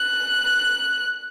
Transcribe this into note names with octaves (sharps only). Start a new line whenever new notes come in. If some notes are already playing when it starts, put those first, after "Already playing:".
Already playing: F#6